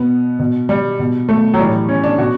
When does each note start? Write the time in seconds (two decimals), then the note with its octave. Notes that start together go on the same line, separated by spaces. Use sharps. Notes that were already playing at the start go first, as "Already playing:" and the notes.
Already playing: B2 B3
0.39 B2
0.69 G3
0.99 B2
1.29 A3
1.54 F#3
1.59 A2 E3 G3
1.89 C#4
2.04 D4
2.18 B2 F#4